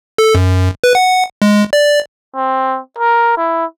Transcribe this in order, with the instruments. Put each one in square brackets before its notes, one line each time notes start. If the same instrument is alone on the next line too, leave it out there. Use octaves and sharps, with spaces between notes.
[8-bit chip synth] A4
F#2
B4
F#5
G#3
D5
[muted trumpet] C4
A#4
E4